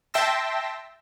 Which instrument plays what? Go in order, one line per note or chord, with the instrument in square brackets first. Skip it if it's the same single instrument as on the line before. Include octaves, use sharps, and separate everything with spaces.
[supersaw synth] E5 G5 A5 C6 E6 A#6